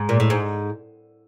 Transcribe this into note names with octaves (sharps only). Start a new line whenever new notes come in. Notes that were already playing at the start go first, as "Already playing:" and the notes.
Already playing: G#2
A#2
A2
G#2